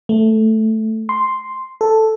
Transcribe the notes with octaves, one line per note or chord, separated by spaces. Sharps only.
A3
C6
A4